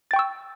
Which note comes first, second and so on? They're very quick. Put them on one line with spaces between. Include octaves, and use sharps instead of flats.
A6 G5 C#6 E6